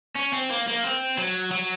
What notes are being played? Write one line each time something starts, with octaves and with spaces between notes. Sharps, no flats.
C#4
C4
A#3
A#3
C4
F#3
F#3